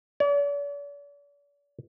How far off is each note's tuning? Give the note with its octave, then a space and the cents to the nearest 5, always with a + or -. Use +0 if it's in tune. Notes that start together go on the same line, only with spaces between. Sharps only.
D5 -45